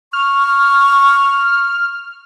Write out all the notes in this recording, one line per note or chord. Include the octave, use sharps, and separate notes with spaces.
C#6 F6